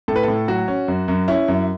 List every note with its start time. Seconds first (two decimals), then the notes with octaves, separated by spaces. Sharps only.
0.08 A2 A4
0.16 B4
0.23 A2 A4
0.48 F#3 F#4
0.68 C#4
0.88 F#2
1.08 F#2
1.28 C#4 E4
1.48 F#2